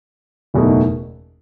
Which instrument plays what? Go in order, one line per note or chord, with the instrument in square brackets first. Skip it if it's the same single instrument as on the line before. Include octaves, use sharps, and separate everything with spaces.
[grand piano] F#1 E2 B2 A3 D#4